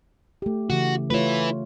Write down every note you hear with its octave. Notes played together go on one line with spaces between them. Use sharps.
A3 G4
C#3 E3 F#4
A3 E4 F4 B4 C#5